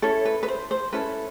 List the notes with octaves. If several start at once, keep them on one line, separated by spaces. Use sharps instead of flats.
C#4 E4 A4 C#5
B4
B4
C5
C5
C#4 E4 A4 B4